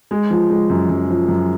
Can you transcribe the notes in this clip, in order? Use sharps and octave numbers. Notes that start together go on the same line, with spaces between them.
G#3
F3
G#3
F#2
F#2
F3
F#2